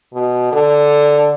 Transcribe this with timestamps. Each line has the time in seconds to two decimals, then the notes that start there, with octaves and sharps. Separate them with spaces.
0.14 B2
0.52 D3